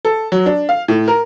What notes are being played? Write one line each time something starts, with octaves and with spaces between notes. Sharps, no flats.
A4
F#3
D4
F5
A2
A#4